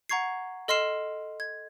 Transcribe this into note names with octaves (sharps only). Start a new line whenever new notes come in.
F#5 A#5 C#6 G#6 C7
A4 D#5 C6 F6 C7 E7
G#6